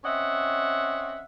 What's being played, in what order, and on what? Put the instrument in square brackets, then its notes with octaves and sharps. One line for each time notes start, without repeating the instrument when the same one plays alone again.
[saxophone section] C4 C#4 D#5 E5 F#5